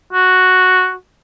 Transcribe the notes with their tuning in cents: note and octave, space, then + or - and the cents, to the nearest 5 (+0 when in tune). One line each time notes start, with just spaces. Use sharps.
F#4 +0